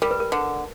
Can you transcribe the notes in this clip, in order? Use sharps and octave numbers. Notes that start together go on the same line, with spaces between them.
G3 A#4
B4
A#4
D3